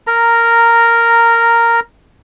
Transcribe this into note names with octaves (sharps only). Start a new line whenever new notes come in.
A#4 A#5